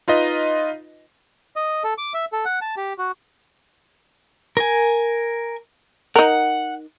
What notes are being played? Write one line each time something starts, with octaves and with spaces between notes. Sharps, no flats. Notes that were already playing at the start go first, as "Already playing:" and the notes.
D#4 F4 B4 D#5
D#5
A4
D6
E5
A4
F#5
A5
G4
F#4
A#4 G#5
D#4 A#4 F#5